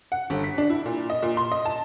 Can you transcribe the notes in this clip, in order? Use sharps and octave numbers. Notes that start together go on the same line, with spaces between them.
F#5
G1
B6
D4
E4
A#2
D#5
A#2
C6
D#5
A5